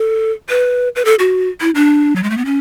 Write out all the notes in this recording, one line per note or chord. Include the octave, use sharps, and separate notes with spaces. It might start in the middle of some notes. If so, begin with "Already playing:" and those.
Already playing: A4
B4
B4
A4
F#4
E4
D4
F#3
G#3
A3
B3
C#4